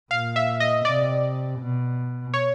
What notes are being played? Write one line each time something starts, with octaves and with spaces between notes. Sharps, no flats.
A#2 F5
E5
D#5
C3 D5
B2
C#5